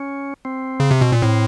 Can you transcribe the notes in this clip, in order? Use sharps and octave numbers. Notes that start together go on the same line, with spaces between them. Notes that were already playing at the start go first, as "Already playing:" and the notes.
Already playing: C#4
C4
C#3
C3
B2
A#2
A2 C4